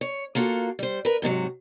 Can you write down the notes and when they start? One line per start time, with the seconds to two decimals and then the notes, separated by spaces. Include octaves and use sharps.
0.01 C#5
0.35 A#3 F4 F#4 A4
0.79 G3 C5
1.05 A#4 B4
1.22 G#2 C3 D#3 F#3